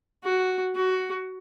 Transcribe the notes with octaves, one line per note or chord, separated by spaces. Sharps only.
F#4
F#4